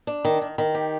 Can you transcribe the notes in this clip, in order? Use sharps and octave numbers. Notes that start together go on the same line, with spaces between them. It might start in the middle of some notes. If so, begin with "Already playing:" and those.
D4
D#3
D#3
D#3
G4